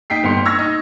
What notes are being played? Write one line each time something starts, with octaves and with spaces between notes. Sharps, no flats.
D#4 G5 B6 C7
G1 G2 B3 G5 C6 C#7
C#6 E6 F6 G#6 A#6
D#4